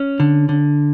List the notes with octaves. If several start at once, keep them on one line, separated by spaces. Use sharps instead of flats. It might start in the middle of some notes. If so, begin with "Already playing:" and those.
Already playing: C#4
D3
D3